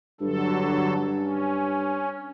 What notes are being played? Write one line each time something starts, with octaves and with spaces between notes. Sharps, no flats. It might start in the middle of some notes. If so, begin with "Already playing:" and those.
G2 D3 F#3 A4
C#4